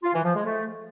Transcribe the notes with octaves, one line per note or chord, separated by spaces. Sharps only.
F4
E3
F3
G#3
A3